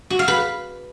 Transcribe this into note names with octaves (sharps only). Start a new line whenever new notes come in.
F#4
F5
B4